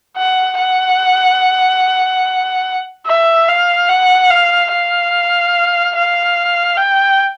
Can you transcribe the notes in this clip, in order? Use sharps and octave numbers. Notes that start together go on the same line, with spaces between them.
F#5
F#5
E5
F5
F#5
F5
F5
F5
G5